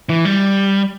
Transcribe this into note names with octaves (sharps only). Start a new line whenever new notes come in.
E3
G3